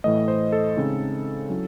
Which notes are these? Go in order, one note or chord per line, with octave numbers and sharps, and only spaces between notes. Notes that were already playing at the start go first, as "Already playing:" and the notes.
A2 E3 A3 D#5
C5
A4
C#3 G#3 C4 D#4
F#3 C#4 E4